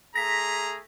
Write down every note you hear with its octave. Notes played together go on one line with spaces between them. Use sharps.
A3 G#4 A#5 A#6 B6